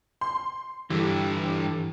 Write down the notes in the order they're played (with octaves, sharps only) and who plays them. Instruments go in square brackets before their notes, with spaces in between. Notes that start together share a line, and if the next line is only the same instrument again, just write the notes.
[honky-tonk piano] C6
[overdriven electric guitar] G2 D3 [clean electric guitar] E3 [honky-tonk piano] G4